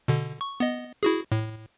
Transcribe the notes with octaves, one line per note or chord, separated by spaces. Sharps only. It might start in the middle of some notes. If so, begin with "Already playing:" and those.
B2 D3
C#6
B3 D#5
E4 F#4 G#4
A2